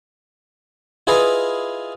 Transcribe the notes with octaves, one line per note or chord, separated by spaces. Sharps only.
E4 F4 G#4 B4 D#5 F5